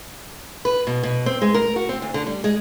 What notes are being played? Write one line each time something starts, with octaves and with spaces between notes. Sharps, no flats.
B4
B2
B2
C4
G#3
A#4
F#4
C4
D2
D3
G3
G#3